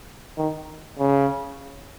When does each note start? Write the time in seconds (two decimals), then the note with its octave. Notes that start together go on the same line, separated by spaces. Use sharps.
0.38 D#3
0.99 C#3